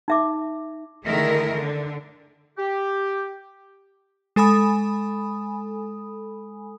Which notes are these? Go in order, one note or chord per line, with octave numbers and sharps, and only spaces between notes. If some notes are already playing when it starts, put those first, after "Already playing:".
D#4 E5 D6
D3 D#3 A3 E4 G#4 A#4
D3 D4
G4
G#3 A4 G#5 B5 D#6